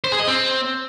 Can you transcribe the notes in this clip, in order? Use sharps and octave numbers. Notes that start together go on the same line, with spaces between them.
C5
G#4
D#5
C4